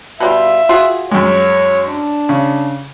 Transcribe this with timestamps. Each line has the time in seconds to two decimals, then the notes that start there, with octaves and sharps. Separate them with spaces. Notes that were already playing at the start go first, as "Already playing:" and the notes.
0.20 B2 G3 F4 E5
0.69 F4 F#4 G#4
1.11 F#2 G#3 C#5
1.89 D4
2.29 C#3